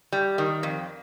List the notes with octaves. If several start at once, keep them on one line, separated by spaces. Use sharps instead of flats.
G3
D#3
F2